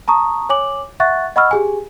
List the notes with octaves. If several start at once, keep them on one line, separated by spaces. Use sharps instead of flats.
A5 A#5 C#6 D#6
C#5 G#5 D6 F#7
E5 F#5 C#6 F#6 A6
D#5 F#5 B5 C#6 E6 F6
G4 G#4 G#5